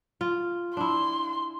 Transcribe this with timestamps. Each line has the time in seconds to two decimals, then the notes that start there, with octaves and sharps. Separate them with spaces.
0.21 F4
0.77 D4 E4 C6